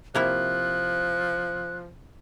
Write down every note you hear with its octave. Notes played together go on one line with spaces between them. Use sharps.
C3 F3 A#3 E4 F#6